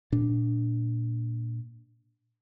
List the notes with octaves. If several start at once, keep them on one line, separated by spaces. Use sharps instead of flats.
A#2 D4